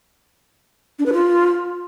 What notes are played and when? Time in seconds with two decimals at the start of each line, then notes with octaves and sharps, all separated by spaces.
0.99 D4
1.06 B4
1.13 F4